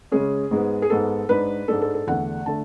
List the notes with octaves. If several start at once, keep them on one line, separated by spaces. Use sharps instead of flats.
C#3 G#3 C#4 G#4
G#2 G#3 B3
G#4
G#2 G#3 B3 A4
G#2 G#3 D4 B4
G#2 G#3 D4 A4
A4
A4
E2 D3 A3 D4 F#5
D3 A3 A5